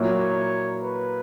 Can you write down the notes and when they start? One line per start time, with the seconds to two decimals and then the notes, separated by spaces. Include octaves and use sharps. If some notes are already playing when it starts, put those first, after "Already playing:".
Already playing: A#2 F#3 A#3 E4 C#5
0.83 B4